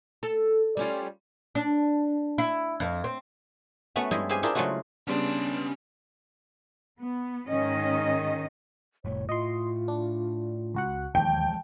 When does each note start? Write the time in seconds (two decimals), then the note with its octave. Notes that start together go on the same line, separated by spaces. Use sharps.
0.23 A4
0.77 G3 C#4 F4
1.55 D4
2.38 E4
2.80 F2
3.04 C4
3.96 A3 B3 C#4 F#4
4.11 G2 G3 G#3 E4 D#5
4.29 C4 G4 G#4 F5 G#5
4.43 D4 E4 F4 G4 G#4 A#4
4.55 C#3 F#3 G#3 A3 F4 F#4
5.07 C#3 G3 B3 C#4 D4 C6
6.98 B3
7.47 G#2 D#3 C#4 D#5
9.05 F1 A2 C#5
9.29 A2 F4 D#5 C6
9.88 D4
10.74 C#2 F#4 F#5
11.15 D#2 E3 F3 G#3 G5 A5